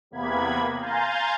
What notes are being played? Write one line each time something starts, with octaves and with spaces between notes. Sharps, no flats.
E2 C3 A#3 B3 B5 G#6
F5 G#5 A#5 C6 G6 A6